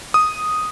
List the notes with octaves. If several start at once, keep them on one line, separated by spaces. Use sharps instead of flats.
D#6